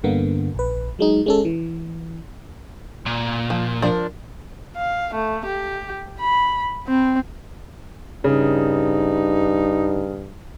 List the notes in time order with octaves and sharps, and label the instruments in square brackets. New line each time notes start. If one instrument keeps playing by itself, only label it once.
[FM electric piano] G2 D3 A#3 B3
A#1 B4
F#3 G#3 D#4
G#3 C#4 A4
E3
[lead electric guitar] A#2
[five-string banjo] F3
F3 D4 A#4
[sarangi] F5
A3
G4
B5
C4
[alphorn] G2 [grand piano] C#3 [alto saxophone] D#4